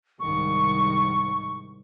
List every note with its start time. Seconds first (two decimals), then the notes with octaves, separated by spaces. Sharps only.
0.20 C2 G#2 D#3 C#6